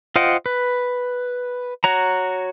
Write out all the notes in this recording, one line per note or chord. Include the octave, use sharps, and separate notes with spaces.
F4 C5 D#5 F#5 G5
B4
F#4 C#5 A#5